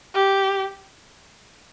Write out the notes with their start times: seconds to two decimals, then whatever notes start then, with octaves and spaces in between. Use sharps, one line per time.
0.15 G4